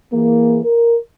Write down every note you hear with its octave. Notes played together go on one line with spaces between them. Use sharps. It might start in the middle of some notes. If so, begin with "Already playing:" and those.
E3 A#3 G#4
A#4